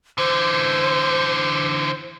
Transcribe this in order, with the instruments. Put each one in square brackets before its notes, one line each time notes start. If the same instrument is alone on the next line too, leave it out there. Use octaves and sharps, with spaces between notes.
[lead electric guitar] D3 E3 [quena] C5